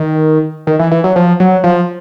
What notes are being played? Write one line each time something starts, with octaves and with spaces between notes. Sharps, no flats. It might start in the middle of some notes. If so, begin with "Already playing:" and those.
Already playing: D#3
D#3
E3
E3
F#3
F3
F#3
F3